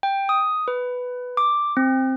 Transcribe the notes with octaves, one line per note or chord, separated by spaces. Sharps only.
G5
D#6
B4
D6
C4